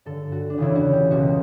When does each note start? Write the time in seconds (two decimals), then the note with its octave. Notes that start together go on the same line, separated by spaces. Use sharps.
0.05 G2 D3 A4
0.32 F#4
0.50 D4
0.58 E2 C#3 E3 E4
0.75 F#4
0.93 G4
1.10 C#2 B2 F#4